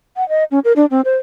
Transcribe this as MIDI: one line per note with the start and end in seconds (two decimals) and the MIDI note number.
0.17 0.27 78
0.29 0.44 75
0.51 0.59 61
0.65 0.73 70
0.76 0.86 62
0.91 1.01 60
1.05 1.16 72